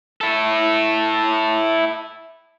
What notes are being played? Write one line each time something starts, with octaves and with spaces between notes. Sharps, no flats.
E4 A4